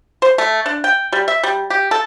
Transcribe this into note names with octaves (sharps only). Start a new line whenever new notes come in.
C5
A3
D4
G5
G3
E5
G3
G4
A4